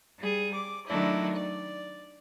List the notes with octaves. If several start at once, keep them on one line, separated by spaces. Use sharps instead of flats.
G3 G#4
D6
D#3 F#3 A3 D4 E4
D5